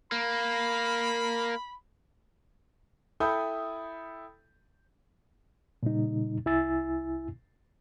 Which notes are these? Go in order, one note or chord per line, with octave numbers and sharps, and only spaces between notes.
A#3 B5
E4 A4 G5 B5 D#6 G6
A#2 C#3 G3 D#4
C2 E4 G#5 E6 A6